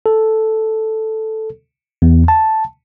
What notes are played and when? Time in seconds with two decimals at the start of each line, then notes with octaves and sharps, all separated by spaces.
0.06 A4
2.02 E2
2.28 A5